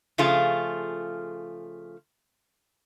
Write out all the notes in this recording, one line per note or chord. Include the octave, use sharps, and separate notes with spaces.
C#3 F3 A3 F4 G#4